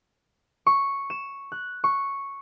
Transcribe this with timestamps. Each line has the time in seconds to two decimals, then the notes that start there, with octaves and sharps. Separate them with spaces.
0.66 C#6
1.10 E7
1.52 F#6
1.84 C#6